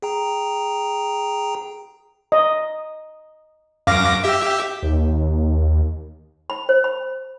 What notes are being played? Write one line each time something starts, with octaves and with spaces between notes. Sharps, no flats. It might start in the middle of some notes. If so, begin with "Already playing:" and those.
G#4 G5 A#5
D#5
F#2 F5 D6 A#6
G4 E5
D#2
B5
C5
B5